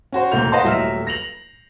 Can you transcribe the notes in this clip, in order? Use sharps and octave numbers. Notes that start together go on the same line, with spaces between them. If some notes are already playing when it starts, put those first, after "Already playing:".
C#4 F#4 C5
E1 D#2 G#2 A3 G6 F7
B4 D#5 F5 F#5 A5 C6
D#1 F#3 A3 E5 F6 E7
A#6 F7 F#7